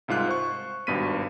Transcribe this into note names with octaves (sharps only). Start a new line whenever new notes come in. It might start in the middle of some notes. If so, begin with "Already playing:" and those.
C2 G#2 F4 F#6
C5 C#6
G#1 G2 B2 B6 D#7